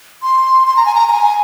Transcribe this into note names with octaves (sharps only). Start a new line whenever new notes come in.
C6
C6
A#5
G#5
A#5
A#5
G#5